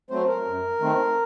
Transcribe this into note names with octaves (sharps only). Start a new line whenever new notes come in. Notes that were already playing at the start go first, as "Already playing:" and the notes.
F#3 A3 C4 C5
A#4
F#2
D#3 A3 C4